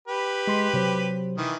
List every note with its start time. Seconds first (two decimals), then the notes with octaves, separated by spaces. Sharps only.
0.08 G4 B4
0.47 G#3 C6 B6
0.74 C3 F#3 C5
1.37 D#3 E3